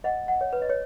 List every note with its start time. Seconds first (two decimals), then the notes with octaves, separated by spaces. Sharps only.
0.04 D#5 F#5
0.28 F#5
0.41 C#5
0.53 B4
0.62 D#5
0.69 C#5